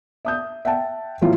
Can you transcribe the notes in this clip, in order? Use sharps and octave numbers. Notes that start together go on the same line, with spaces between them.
E5 D#6 G6
E5 F#5 G5 A5
A2 E3 F#3 A3 F4